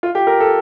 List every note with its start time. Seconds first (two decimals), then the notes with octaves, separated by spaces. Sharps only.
0.03 F4
0.15 G4
0.27 A#4
0.40 A4